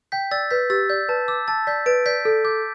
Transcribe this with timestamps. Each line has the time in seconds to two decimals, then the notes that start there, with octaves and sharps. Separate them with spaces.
0.12 G5 G6 B6
0.31 D5 E6 A6
0.50 B4 G6 B6
0.70 G4 E6 A6
0.90 D5 G6
1.09 B4 A5
1.28 D6 E6
1.48 A5 E6 A6
1.67 D5 G6 B6
1.86 B4 A6 D7
2.06 D5 G6 B6
2.25 A4
2.44 D6 G6